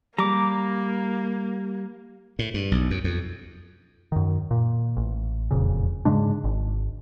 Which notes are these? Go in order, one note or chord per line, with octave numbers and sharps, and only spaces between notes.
G3 A#3 A#5 D6
A2
G2
B1
F#2
F2
F#2 D#3
A#2
A1
E1 F2 A#2 C#3
G#2 C#3 G#3 D4
G#1